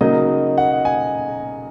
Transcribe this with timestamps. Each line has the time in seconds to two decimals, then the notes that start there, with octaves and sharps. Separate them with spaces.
0.01 C#3 F#3 A#3 D#4 D#5
0.58 F#5
0.85 G#5